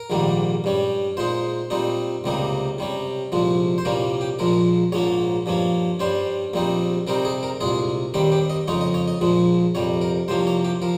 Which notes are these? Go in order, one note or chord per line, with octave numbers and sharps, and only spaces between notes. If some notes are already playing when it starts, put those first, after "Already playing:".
Already playing: A#4
A#1 G#2 D#3 G3 A#3
G2 G3 C#4
A#2 G#3 D#4 C5
A#2 G3 C4 D#4
C#2 C3 G3 A#3 D#4
C3 G3 C#4
C2 A#2 F3 G#3
C5
C2 A#2 G3 A#3 C#4 A#4
G4
A#1 A#2 F3 G#3 A#4
A#1 G#2 F3 A#3 C#4 C#5
G2 F3 A#3 C#4
G2 G3 C#4 C5
A#1 A#2 G3 C4 D#4
C3 G3 C4 D#4 A#4
G#4
A#4
C2 A#2 G#3 G#4
D#2 D#3 G3 C4 G4
G4
D#5
F2 C#3 G#3 D#4 C#5
D#5
C#5
D#5
A#1 A#2 F3 G#3
F2 C3 G3 C#5
A#4
C2 C3 F3 A#3 C#4 C5
C#5
G4
F3 A#4